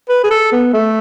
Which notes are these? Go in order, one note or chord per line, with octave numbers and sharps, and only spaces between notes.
B4
G#4
A4
B3
A3